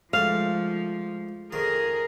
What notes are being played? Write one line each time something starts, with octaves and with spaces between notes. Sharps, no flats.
G#2 F3 A3 F5
F2 D#3 G#4 A#4